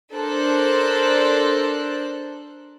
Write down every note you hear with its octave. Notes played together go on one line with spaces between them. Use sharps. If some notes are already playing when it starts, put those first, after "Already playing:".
D4 A4 A#4 C5 F#6